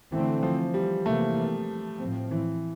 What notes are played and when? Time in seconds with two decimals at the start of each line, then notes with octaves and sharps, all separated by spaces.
0.12 D3 E3 A3 C4
0.43 F3
0.74 G3
1.05 C3 E3 A3 A#3
2.00 A2 F3 C4
2.31 E3